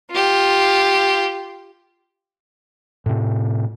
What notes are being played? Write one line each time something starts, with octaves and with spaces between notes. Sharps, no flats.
F4 G4
A2 C3